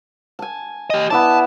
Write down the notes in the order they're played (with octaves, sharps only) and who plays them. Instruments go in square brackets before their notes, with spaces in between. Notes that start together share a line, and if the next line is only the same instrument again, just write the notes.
[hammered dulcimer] G#5 A5
[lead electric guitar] G4 D#5
[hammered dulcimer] B3 E4 D5 [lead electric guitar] A5